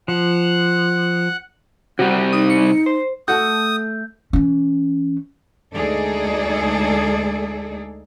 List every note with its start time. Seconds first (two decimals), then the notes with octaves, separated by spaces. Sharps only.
0.08 F3 F#5 F#6
1.99 C3 G3 F#4 F#5
2.33 D#4 D#6
2.50 C#7
2.86 C5
3.28 A3 F#4 A4 D#6 G6
4.33 E3 C#4
5.73 D2 G#3 D#4 G#4 A4 D5